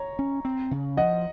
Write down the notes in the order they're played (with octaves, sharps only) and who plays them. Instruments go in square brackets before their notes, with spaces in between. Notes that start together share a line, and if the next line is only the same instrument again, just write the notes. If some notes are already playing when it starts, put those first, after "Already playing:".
Already playing: [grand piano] C#5 A#5
[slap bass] C#4
C4
C#3
[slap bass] F3 [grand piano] D#5 F#5